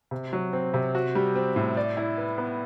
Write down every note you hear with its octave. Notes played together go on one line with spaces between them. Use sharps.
C3
F#3
C4
C3
F#4
G3
C4
A2
D5
E4
B4
B3